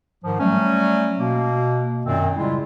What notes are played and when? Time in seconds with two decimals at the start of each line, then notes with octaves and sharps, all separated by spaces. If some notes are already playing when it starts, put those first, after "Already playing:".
0.24 G#2 D#3 F3
0.40 F#3 G3 A3 C#4
1.19 B2 A#3
2.06 F#2 A#2 D#3 C4
2.36 A2 C#3 G3 G#3 E4 F4